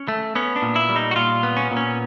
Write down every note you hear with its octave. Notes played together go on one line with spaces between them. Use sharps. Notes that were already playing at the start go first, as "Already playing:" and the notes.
Already playing: C#4
A3
B3 C#4
D4
A#2
E4
G3
D#4
F#4
A#2 F4
B3
C#4
A#2
C#4